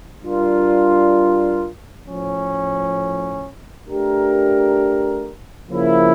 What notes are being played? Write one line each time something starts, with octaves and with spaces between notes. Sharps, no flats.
G3 D4 F4 A#4
A2 F3 C#4
A3 D4 G4 A#4
C#3 F3 A#3 E4